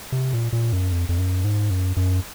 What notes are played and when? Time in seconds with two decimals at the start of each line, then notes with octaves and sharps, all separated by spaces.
0.12 C3
0.33 A#2
0.53 A#2
0.72 F#2
0.92 F2
1.09 F2
1.18 F#2
1.44 G#2
1.70 F#2
1.97 F#2